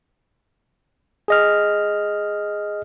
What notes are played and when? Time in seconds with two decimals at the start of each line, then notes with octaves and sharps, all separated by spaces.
1.28 G#4 D#5 F6